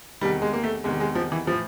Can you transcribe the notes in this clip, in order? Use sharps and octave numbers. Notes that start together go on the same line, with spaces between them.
E2 C3 D#3 G3
G#3
A#3
A3
E2 C3 D#3 G#3
G#3
F3
E3
A2 E3 F3